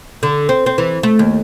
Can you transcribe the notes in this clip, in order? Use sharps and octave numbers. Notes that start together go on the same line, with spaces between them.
D3
C4
C4
E3
A3
D#2